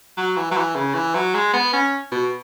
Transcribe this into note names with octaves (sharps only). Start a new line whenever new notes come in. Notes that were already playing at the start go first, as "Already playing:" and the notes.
F#3
E3
F#3
E3
C#3
E3
F#3
G#3
B3
C#4
B2